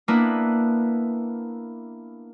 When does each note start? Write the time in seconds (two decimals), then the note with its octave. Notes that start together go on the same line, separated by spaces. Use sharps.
0.08 A#3 B3 D4 E4 B4